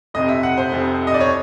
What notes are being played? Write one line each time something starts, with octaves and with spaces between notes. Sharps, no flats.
F1 F2 C3 D#5
E5
F#5
C5
F1 F2 C3
D#5
D5
C#5